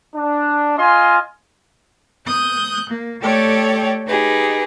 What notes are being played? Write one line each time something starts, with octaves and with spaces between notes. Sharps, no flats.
D4
F4 D#5 G#5 C6
D#6 F#6 G6
A#3
A3 G4 A4 C#5 D5 G5
D#4 G4 G#4 B4